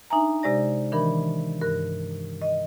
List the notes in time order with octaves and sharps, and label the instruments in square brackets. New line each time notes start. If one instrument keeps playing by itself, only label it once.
[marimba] D4 D#4 E5 G#5 A#5
C3 G#3 G4 D5 A#6
D#3 E3 D4 A#4 B5
G2 A#4 F#6
D#5